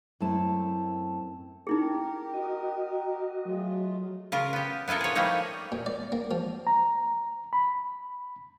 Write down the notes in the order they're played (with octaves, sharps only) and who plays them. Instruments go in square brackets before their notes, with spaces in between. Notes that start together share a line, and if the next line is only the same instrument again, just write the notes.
[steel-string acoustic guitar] F#2 A3 C4 E4 A5
[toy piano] D#4 E4 G#4 [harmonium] G4 A#4
[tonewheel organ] F#4 D#5
[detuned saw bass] F#3 [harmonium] G#3 A3 F4
[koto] C#3 F4 A#4
B3 G4
B3 E4 F4 A4 A#4
G#4 C#5
F3 G3 A3 A#3 D#4
[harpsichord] A#2
D5
A#3
F3
[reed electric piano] A#5
B5